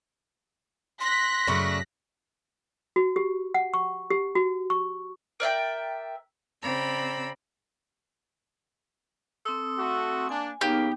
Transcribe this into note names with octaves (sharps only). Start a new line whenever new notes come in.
C6 F#6 A#6 B6
F#2 C#3 A3 D4
F#4
G4
F#5
C#6
G4
F#4
C#6
A#4 D5 E5 G5
C#3 C4 D5 A#5 B5 E6
C4 A4 C6 D#6
A3 F#4
A#3 D4 G#5
C#3 A#3 B3 D#4 G4